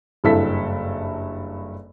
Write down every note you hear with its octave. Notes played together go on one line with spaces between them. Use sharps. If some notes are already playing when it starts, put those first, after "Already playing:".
F#1 G2 E4 A4 E5 B6